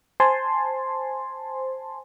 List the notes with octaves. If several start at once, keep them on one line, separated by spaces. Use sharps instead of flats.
C5 G#5 A5 C6